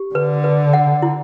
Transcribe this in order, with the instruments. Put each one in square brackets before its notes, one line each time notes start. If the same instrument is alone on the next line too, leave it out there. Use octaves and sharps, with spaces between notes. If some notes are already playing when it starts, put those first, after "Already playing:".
Already playing: [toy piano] G4
[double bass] D3 [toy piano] B4
[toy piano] B4
F#5
E4